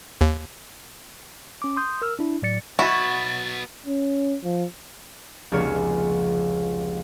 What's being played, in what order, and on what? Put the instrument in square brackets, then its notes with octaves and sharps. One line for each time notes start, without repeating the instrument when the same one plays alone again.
[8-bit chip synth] D#2
[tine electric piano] C#4 D6
C6 D#6 G6
A#4 E6 F6
D4 E4
A2 F#3 D5 A6 C#7
[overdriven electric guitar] F#3 B3 [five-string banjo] E4 [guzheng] F#4 [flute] A6
[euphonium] C#4
F3
[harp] F1 C#2 A#3 C#4 C#5